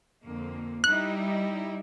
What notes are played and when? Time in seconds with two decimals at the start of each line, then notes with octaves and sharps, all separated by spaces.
0.25 F2 D3 A#3
0.84 G3 D#4 E4 F#6